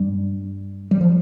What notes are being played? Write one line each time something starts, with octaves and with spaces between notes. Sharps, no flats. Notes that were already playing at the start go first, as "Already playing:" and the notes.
Already playing: G2 G3
G3
F3